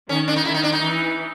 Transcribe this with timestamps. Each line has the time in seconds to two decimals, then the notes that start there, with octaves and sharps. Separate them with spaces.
0.09 D#3 C#4
0.28 D4
0.36 D#4
0.45 D#3 E4
0.54 D#4
0.63 D4
0.72 D#4
0.81 E3